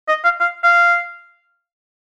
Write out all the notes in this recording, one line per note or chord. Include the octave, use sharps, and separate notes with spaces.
D#5
F5
F5
F5